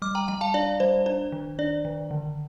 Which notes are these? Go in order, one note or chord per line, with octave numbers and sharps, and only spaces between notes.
G3 D6 F6
G5 A#5
G3 G5 A#5
F5 A5
D4 D5
G3 C5
D4 C5
D#3
D4 D5
D#3
D3